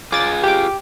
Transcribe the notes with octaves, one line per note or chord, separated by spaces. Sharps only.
F4 G#4 D6 A6
G4 D6